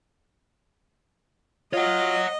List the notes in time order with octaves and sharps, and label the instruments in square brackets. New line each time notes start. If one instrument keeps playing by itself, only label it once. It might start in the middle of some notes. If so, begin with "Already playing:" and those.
[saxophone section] F4 [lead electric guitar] C#5 F#5 [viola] D#5